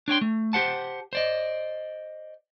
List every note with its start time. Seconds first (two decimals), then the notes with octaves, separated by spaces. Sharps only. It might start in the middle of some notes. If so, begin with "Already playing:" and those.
0.08 D4 C#5 G5 C6
0.21 A3
0.53 G4 C5 F#5 A5
1.13 C5 D5 D#5